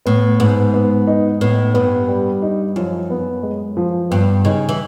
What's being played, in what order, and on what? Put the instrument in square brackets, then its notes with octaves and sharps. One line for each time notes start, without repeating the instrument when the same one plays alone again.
[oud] A2 [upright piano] B3
[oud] G#2 [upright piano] B3
[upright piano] B3
D#4
[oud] A2 [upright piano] B3
[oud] G2 [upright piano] B3
[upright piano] G3
D#4
[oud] F#2 [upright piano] F3
[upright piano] B3
G#3
F3
[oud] G2 [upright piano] B3
[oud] C#3 [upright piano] D#4
[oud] E3